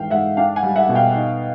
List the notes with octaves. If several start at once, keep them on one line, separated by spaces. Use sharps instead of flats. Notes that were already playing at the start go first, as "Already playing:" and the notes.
Already playing: G#2 E3 F5 G5
G#2 E5 F#5
D4 F5 G5
F#5 G#5
G3
E5 F#5
B2
F5 G5
D#4